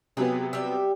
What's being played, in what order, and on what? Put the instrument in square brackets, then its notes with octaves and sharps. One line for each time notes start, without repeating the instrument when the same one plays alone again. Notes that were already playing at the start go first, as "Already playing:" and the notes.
[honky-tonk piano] C3 F#3 B3 [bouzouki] G4 G#4 B4
[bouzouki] G3 G4 E5